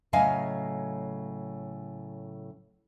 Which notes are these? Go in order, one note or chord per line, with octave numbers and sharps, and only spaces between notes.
A2 C#3 F#3 D#5 F5 G#5